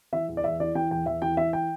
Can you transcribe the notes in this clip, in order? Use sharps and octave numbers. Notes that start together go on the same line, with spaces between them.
E3 E5
E2
D5
E2 E5
E3 D5
E3 G5
E2 G5
E2 E5
E3 G5
E3 E5
G5